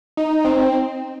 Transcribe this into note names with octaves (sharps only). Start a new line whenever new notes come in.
D#4
C4